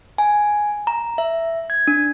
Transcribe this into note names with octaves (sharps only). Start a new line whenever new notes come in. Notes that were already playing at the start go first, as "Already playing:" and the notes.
G#5
A#5
E5
G#6
D4